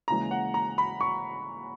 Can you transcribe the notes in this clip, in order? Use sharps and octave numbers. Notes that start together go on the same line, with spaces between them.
D#2 C#3 E3 G#3 A#5
F#5
A#5
B5
C#6